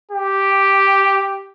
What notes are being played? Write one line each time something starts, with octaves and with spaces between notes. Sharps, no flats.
G4